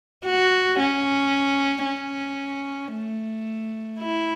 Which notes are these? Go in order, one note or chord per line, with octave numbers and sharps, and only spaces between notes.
F#4
C#4
C#4
A3
E4